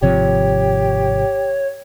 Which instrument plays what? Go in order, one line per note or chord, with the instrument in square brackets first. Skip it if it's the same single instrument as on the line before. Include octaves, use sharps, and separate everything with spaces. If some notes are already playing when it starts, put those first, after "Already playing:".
[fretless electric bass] G#1 C3 F3 [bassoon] G4 [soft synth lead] C#5